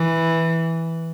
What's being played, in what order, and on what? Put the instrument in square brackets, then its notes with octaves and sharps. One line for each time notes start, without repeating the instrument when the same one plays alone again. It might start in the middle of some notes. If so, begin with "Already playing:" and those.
Already playing: [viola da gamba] E3